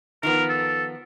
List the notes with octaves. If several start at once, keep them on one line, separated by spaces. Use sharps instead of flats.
D#3 F3 B3 A#4
A4